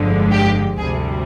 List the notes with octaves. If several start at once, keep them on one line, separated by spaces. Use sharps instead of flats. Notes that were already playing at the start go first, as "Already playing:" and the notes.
Already playing: G1 F2 D3 F3 G#3
G4
D2 C3 G3 G#4